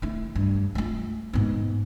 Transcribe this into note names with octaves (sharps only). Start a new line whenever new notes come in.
A3 E4
G2
A3 F4
G#2 B3